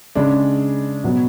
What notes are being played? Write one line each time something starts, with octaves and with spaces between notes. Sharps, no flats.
C#3 G#3 D4
B2 F#3 B3